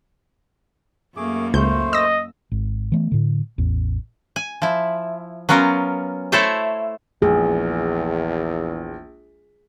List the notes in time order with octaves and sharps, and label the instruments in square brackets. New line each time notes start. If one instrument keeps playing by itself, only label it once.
[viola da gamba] F#2 A#3 [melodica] A3 G#4 D6
[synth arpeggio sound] C#2 G6 [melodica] A3 C5
[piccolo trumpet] D#5 [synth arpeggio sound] E6 A#6
[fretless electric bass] G#1
E3 A3 B3
A2 D3
A1 E2
[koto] G#5
F3 E4
F#3 B3 C#4 F4 A#4
A3 E4 A4 C5 C#5 E5
[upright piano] A#1 [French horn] E2 [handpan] G#4